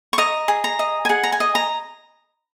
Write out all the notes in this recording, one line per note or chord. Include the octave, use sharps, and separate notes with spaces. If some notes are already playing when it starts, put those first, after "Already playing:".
C#6
D#5 A#5
G#4
A#5
D#5
G#5
G#4 F#5
A#5
G#5
D#5
A#5